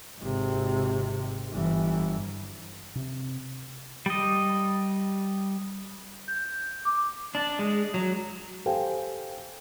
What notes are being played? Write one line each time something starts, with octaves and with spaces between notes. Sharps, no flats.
G#1 C3
G1 E3
C3
G3 D#5
G6
D6
D4
G#3
F#3
G4 A4 C5 F5 G5 G#5